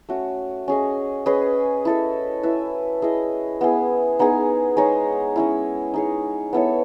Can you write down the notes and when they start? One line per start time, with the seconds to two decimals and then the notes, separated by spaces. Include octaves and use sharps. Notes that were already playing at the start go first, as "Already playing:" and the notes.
0.09 A3 C#4 F#4
0.68 C#4 G#4 D#5
1.26 C#4 G#4 B4 D#5
1.85 E4 A4 D#5
2.43 E4 B4 E5
3.02 E4 G#4 D#5
3.61 B3 E4 G#4
4.19 B3 D#4 G#4
4.77 G#3 D#4 G#4 C#5
5.36 G#3 C#4 E4
5.94 D#4 G#4 C#5
6.53 B3 E4 A4 C#5